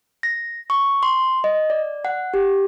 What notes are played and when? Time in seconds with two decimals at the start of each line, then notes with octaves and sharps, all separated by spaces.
0.23 A#6
0.70 C#6
1.03 C6
1.44 D#5
1.70 D5
2.05 F#5
2.34 G4